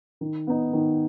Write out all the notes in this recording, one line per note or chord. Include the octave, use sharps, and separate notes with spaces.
D#3
B3 D#4
D#3